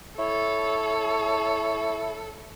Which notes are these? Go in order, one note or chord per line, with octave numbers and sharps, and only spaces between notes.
E4 A4 C#5